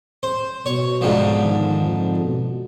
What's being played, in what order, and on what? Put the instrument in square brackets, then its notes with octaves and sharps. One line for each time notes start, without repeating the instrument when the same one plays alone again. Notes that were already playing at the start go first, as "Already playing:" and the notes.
[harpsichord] C5
[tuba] B2 [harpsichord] C#5
[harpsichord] G#2 D3 F3
[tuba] D#3
F2
B2